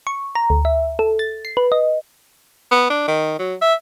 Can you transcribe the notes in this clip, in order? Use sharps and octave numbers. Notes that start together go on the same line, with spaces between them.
C#6
A#5
D2
E5
A4
A6
C7
B4
D#5
B3
D4
D#3
F#3
E5